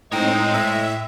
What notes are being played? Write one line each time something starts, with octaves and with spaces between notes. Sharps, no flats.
A2 G#3 C4 D#4 C#5 G5
A2 E5